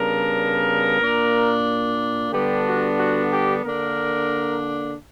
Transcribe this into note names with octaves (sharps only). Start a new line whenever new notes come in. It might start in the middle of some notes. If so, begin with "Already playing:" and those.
Already playing: C#3 G3 B3 D4 A#4
A#2 A#3 D4
D3 G3 B3 D4 G4
F#4
F#4
G4
D3 A#3 D4 A#4